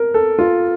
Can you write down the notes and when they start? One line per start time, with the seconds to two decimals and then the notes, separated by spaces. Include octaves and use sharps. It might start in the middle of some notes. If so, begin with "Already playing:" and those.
Already playing: A#4
0.14 A4
0.39 F4